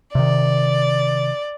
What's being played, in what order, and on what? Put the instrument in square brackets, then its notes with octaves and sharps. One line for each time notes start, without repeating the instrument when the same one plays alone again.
[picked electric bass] C3 D#3 [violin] D5